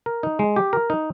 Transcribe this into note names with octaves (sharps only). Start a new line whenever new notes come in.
A#4
D#4
G#3
G4
A#4
D#4